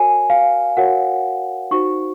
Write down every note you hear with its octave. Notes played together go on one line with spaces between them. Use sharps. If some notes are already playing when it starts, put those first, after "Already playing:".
Already playing: F#4 A#4 C#5 G#5
F5
F#4 A#4 C#5 F#5
D#4 F#4 C5 C#6